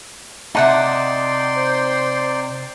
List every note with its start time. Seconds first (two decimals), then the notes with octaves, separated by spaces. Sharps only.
0.55 C3 D#4 D5 E5 F#5 G5 A5 C6
1.55 C5